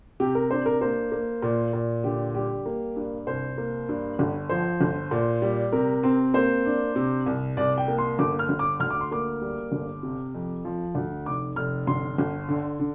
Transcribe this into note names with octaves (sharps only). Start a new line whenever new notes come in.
C3 G4
A#4
D4 C5
A#4
A#3 C5
A#3
A#2
A#2
D3 G4
G3 G4
A#3
G2
C2 C5
A#3
G2
G1
F3 C5
G1
A#2
G3
C3 A#4
C4
A#3 C5
D4
C3
C2
C2 D5
G5
A#3
C6
G1 D6
F6
G1
D6
D2 F6
D6
C6
A#3 D6
G3
G1
C3
F2
F3
D2
F1 D6
F1 F6
G1 C6
G1
D3
D3